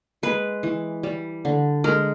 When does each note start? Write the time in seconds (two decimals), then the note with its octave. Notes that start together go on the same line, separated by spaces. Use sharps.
0.23 G#3 B4
0.63 E3
1.03 G3
1.45 D3
1.84 G#3 A#4